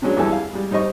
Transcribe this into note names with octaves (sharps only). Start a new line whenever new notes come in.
F#3 G#3 B3 C#4 D4
E2 E3 G3 A4 G#5
F5
G3 G#3
G3 D#4 C5 D#5 C#6